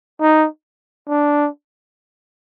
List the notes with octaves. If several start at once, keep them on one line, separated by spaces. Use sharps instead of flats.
D#4
D4